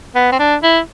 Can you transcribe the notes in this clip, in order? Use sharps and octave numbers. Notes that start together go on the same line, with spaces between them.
B3
C4
D4
E4